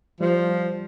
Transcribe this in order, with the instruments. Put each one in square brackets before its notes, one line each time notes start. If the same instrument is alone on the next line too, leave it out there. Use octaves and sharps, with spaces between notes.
[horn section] F3 [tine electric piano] G3